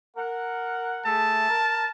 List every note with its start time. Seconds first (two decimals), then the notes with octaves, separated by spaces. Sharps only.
0.17 A#4 F#5
1.06 A3 G#4 E5 A5
1.50 A#4